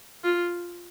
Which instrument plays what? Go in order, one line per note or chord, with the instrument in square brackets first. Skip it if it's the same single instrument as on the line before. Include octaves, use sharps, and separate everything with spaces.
[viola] F4